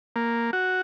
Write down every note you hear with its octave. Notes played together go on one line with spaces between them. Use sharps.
A#3
F#4